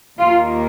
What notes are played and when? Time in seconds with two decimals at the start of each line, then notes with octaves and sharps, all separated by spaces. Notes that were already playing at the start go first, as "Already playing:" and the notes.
0.18 D#2 D#3 A#3 F4